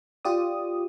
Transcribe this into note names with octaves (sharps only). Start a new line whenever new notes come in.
F4 G4 D5 D#6